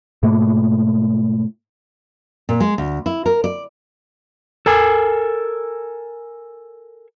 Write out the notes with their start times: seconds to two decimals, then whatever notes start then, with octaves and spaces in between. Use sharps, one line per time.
0.23 G#2 B2 A3 A#3
2.49 A#2
2.60 G#3
2.78 D2
3.06 E4
3.26 A#4
3.44 D5
4.66 A4 A#4 G#5